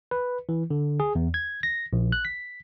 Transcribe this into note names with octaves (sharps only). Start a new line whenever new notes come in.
B4
E3
D3
G#4
E2
G#6
A#6
A#1
F#6
B6